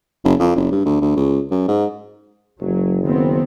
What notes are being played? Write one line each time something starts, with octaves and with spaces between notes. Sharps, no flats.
F#1
F2
F#1
G2
D2
D2
C#2
F#2
G#2
F#1 F#3
D#3 B3 C4